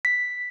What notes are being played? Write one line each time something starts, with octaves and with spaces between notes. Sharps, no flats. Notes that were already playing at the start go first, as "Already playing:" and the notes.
B6